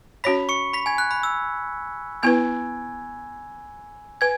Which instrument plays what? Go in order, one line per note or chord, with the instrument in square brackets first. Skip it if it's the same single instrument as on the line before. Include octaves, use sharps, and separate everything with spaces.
[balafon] C#4 F#4 C#5 [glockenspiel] B5 B6
[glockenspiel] C#6 C#7
B5 B6
G#5 G#6
F#6
B5
E6
[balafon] B3 E4 B4 [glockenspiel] G#5 G#6
[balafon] B4 [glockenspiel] G#5 G#6